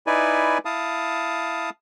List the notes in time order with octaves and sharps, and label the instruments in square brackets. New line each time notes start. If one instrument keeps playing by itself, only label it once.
[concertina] D#4 E4 B4 D5 G#5
E4 F5 A5 D#6